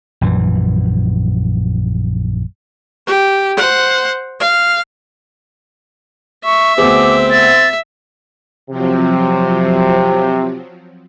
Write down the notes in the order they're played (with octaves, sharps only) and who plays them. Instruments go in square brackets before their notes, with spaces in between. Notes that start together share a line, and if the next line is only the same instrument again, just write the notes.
[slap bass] A#1 F#2 E3
[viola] G4
C5 F#5
F5
[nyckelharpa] E5 [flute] C#6
[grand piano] D2 B3 G#4 [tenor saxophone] C4 [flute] D6
[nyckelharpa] E5 [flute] A6
[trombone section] C3 [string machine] F3 F#3 C4